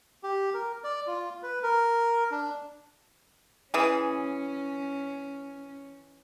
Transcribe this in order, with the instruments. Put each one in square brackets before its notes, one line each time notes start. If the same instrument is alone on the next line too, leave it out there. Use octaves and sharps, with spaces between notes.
[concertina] G4
A#4
D5
F4
B4
A#4
D4
[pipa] E3 G#4 [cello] C#4